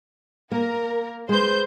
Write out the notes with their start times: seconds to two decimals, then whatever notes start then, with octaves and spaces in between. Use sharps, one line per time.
0.52 A#3 A#4
1.29 G#3 B4 C5 G6